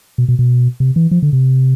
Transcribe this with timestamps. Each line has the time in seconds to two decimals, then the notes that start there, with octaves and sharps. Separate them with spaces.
0.18 B2
0.28 B2
0.39 B2
0.80 C3
0.96 E3
1.11 F3
1.23 D3
1.33 C3